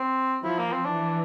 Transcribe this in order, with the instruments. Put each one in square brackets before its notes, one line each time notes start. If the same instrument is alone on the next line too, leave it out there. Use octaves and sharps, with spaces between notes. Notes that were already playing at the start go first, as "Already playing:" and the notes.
Already playing: [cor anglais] C4
[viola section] F3 [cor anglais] E4
[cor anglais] A#3
C4
[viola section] E3 [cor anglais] D4